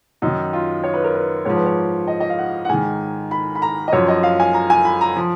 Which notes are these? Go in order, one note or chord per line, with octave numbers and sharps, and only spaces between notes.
F#2 D#3 D#4
F4
C#5
B4
A#4
B4
G#2 F3 C#5
B4
C#5
D#5
D#5
F5
F#5
F#5
G#2 D#3 G#5
B5
B5
A#5
D#5
F#2 F3 C#5
D#5
F5
G#5
A#5
G#5
B5
A#5
F3